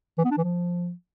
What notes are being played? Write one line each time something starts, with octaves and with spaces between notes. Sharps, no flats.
E3
B3
D4
E3
F3